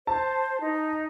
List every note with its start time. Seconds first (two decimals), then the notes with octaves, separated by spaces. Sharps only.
0.07 C5 A5
0.61 D#4